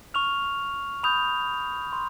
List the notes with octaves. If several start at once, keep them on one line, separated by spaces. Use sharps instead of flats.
C#6 F6 F7
B5 D#6 G6 F7
C6